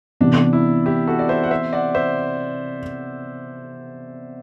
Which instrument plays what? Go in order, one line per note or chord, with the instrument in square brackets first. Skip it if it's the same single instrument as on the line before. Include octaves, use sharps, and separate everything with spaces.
[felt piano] C3 E3 B3 [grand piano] D4
[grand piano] E4
E4 G4
F#4 A4
D5
C5 E5
F#5
C5 E5
D5 F#5
C5 E5